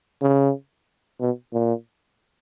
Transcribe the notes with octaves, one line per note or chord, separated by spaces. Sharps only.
C#3
B2
A#2